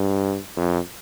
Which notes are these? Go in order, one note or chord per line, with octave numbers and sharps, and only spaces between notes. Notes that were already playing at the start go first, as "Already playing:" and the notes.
Already playing: G2
F2